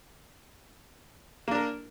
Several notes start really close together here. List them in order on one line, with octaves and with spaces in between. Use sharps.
A#3 D4 A#4